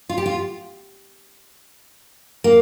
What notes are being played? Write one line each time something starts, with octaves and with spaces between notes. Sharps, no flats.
F4
G4
F4
A#3